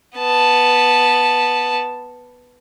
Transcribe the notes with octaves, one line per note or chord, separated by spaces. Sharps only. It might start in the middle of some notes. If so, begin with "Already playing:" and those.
B3 A5